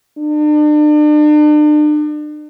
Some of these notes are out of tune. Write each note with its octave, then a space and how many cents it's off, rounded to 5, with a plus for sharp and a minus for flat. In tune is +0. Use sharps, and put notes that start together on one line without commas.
D4 +40